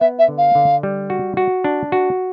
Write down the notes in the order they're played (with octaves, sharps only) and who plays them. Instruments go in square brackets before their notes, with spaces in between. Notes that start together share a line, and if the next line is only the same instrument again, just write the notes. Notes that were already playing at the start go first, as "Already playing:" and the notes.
[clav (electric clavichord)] B3 [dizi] E5
[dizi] E5
[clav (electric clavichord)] D3
[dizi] F5
[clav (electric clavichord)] D3
G3
F#4
F#4
D4
F#4